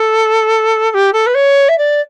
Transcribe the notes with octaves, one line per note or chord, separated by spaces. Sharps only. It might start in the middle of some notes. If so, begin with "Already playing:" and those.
Already playing: A4
A4
G4
A4
B4
C#5
E5
D5